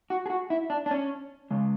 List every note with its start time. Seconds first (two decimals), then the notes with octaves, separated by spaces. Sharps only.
0.10 F#4
0.26 G#4
0.30 F#4
0.50 E4
0.70 D4
0.86 D4
0.91 C#4
1.51 C#3 G#3